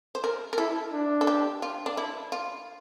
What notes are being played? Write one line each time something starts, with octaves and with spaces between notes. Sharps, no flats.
C5
A#4
A#4
E4 A4
D4
A4
G4
F4
D4
E4
F4